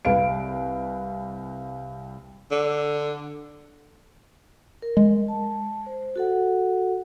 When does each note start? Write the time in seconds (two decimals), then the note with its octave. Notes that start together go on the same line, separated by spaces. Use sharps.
0.05 C2 B4 F5 D7
2.51 D3
4.82 A#4
4.97 G#3
5.28 A5
5.86 C5
6.16 F#4 A4 F#5